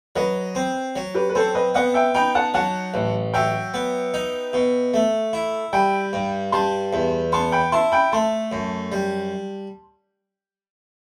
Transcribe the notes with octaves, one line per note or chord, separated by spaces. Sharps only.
F#3 B4 D#5
C4
F#3
G4 B4
B4
C4 A4 C5
B4 D#5
B3 D#5 F#5
E5 G5
D#4 G5 B5
F#5 A5
F#3 F#5 A5
A1
F#3 E5 G5
B3
D#4
B2
A3
E4
G3 G5 B5
G2
G3 A5 C6
E2
B3 A5 C6
G5 B5
E4 A5 C6
G5 B5
A3 A5 C6
F#2
G3